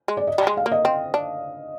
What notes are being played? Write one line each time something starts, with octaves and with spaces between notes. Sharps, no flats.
G#3
D5
D#5
G3
G#3
F5
A#3
D#5
C4
D4